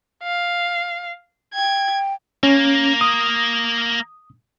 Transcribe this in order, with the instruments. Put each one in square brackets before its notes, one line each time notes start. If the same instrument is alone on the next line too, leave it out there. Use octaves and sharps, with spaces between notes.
[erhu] F5
[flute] G5 [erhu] G#6
[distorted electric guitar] A#3 [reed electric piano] C#4
[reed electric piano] D#6